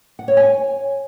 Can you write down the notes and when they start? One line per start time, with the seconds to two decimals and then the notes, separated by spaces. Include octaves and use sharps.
0.19 F#5
0.28 C#5
0.37 G#5